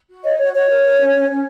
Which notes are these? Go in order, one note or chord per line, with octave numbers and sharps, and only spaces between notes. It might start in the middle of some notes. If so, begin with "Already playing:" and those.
F#4
C#5 D#5
F#4 C#5
F#4 C#5
A#4
A#4
C#4
C#4
C#4